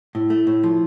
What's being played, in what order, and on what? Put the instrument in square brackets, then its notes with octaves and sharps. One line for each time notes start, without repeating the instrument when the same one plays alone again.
[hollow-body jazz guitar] A2 [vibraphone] E4
[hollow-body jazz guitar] A3
A2
F3